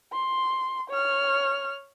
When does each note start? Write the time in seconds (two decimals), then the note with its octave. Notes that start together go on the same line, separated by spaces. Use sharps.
0.13 C6
0.90 C#5 F6